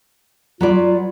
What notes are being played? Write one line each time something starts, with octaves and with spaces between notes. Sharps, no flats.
F#3 F4 B4 D5